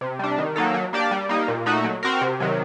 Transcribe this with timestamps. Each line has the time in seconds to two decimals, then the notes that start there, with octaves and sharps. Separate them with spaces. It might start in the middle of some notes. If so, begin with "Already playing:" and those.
0.01 C3
0.19 G3 D4
0.38 D#3
0.56 F#3 A#3 D#4 A4
0.74 F#3
0.93 A#3 D4 G4 D5
1.11 G3
1.29 A#3 D#4
1.48 A#2
1.66 A3 D#4 F#4
1.84 F#3
2.03 C4 F#4 A#4
2.21 C3
2.40 D#3 F#3